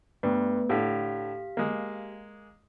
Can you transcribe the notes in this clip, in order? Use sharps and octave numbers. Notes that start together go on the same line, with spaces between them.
G2 A3 B3 B4
A2 D3 G4 F5 B6
G#3 A#3